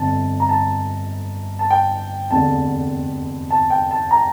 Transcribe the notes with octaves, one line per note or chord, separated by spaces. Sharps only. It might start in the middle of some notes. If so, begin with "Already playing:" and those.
Already playing: G1 F2 D3 A5
A#5
A5
A5
G5
F1 E2 D3 A5
A5
G5
A5
A#5